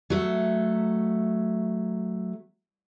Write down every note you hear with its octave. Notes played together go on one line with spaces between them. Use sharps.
F#3 A3